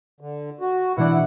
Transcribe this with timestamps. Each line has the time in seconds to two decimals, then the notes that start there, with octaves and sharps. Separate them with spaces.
0.21 D3
0.61 F#4
0.97 B2 E3 D4 E4 F#5